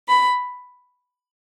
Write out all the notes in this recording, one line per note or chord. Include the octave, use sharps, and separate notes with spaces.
B5